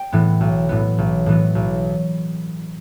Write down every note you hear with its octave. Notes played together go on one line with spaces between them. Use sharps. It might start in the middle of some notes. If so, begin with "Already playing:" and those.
Already playing: G5
A2 E3 B3
B1
A2 E3 B3
B1
A2 E3 B3
B1